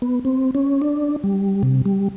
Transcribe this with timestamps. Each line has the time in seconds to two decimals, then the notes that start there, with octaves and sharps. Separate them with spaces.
0.02 B3
0.25 C4
0.55 C#4
0.82 D4
1.24 G3
1.63 C3
1.86 G3